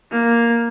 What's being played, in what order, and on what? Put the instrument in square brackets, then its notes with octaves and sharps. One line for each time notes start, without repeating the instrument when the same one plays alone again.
[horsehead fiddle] A#3